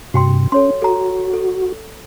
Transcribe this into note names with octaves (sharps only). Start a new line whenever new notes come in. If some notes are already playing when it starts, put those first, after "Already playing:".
G2 C3 F#4 G5 C6
C#4 A4 C#5 C6
F#4 A4 A#5
A4